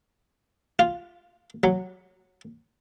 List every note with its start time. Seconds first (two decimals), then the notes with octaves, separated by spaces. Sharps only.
0.79 F4
1.64 F#3